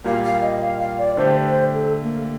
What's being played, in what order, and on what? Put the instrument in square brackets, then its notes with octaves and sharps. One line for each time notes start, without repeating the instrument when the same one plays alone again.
[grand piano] A#2 G3 A#3 [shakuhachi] F5
[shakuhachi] F5
D#5
F5
F5
D5
[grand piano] D3 A3 D4 G4 [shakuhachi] C5
[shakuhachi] C5
A4
A#3